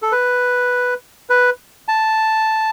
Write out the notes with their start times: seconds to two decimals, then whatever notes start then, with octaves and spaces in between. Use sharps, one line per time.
0.02 A4
0.12 B4
1.30 B4
1.88 A5